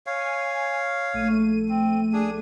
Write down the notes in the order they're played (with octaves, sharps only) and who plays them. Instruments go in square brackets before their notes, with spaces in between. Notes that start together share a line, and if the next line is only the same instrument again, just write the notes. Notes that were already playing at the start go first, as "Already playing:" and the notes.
[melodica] C#5 F5 [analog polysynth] G#5
[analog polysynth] A#1 A3 D#7
[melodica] C4
D4 G#4